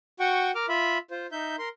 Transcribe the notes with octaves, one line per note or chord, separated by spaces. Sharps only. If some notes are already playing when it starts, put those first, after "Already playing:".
F#4 F#5 G5 C#6
A#4 D6 F6
F4 E5 B5
F4 C5
D#4 E5 G6
A#4 C6